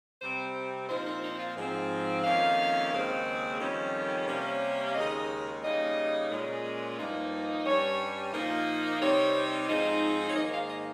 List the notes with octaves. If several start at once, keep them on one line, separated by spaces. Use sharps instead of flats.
C3 G3 C4 C5
A#2 F3 C4 D#4 C5
D#4
D#4
F4
G#2 F3 C4
F2 D#3 A#3 C#4 F5
D#2 C#3 G#3 C4 D#4
F2 D#3 G3 C#4
C3 G3 A#3 C#4
F5
D#2 C#3 G#3 D#4 D#5
C#3 G3 A#3 D#4 D#5
A#2 G#3 C#4
G2 F3 A#3 D#4
G2 G3 C#4 C#5
A#2 F3 A#3 D#4
C3 G3 C4 D#4 C#5
G#2 F3 C4 D#4
C#5
G#2 D#3 A#3 D#5
F5
D#5